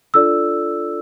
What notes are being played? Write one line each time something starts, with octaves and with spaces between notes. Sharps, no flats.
D4 F4 A4 D5 E6